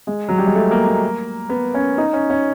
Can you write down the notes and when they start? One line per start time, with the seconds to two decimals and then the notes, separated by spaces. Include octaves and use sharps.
0.07 G#3
0.29 F#3
0.38 G3
0.47 G#3
0.55 A3
0.71 A#3
0.86 A#3
1.50 B3
1.74 C#4
1.98 D#4
2.13 C#4
2.30 C#4